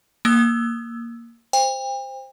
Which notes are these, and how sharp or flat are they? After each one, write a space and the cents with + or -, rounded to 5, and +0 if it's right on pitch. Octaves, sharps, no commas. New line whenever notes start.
A#3 +0 E6 +0
C5 +0 G5 +40